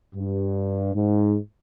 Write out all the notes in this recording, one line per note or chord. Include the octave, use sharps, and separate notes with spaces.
G2
G#2